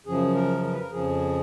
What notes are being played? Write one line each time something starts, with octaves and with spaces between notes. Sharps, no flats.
F#2 C#3 F3 G#4
A#4
A#4
B4
A#4
F2 C#3 F3 G#4